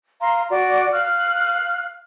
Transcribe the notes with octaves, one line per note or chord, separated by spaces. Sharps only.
F5 A#5 C6
F#4 D5
F5 F6 F#6